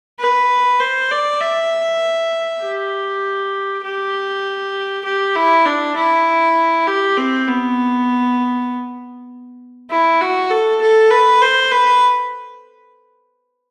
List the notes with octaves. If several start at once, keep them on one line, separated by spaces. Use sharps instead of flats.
B4
C5
D5
E5
G4
G4
G4
E4
D4
E4
G4
C4
B3
E4
F#4
A4
A4
B4
C5
B4